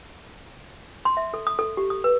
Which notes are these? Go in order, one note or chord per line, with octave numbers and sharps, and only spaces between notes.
C6
E5
A4
D#6
A4
G4
D#6
B4